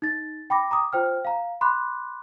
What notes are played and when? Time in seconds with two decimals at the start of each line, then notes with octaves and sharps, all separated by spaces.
0.02 D#4 A6
0.50 G5 B5 D6 A#6
0.71 A#5 D6 D#6
0.93 F4 C5 G5 F6
1.25 F5 A#5
1.61 B5 C6 D6 F#6